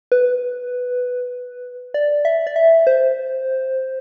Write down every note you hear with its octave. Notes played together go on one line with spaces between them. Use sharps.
B4
D5
E5
D5
E5
C5